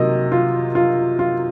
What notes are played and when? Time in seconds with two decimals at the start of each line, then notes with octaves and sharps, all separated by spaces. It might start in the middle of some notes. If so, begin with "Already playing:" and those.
Already playing: C3 D#3 F#3 A#3 D#5
0.32 F4
0.75 F4
1.19 F4